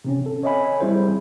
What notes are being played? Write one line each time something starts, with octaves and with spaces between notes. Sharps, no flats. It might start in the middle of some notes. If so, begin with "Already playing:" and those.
C3 C4 C#4
A4
C#5 D#5 E5 G#5 B5
G3 C4 E4 G#4 C5